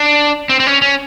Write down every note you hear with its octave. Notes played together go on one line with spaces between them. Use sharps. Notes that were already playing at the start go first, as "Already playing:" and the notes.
Already playing: D4
C4
C4
C#4
C#4